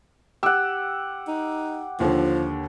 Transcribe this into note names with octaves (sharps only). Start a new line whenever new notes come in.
G4 F#5 E6
D#4
D#2 D3 F3